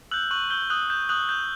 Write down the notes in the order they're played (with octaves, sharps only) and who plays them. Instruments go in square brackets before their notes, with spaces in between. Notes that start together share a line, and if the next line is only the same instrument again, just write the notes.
[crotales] E6 F#6 G6 F#7
C#6 F#6 F#7
E6 G6 G7
D#6 F#6 F#7
G6
D#6 F#6 F#7
G6